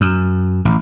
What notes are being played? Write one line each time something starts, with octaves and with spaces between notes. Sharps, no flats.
F#2
A1